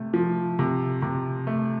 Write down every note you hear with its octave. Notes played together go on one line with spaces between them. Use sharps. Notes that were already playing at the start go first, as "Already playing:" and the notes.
Already playing: C3 A3
F3
C3
C3
A3